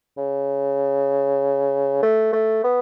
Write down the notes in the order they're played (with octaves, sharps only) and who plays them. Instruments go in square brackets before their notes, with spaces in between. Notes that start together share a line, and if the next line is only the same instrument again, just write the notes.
[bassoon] C#3
A3
A3
B3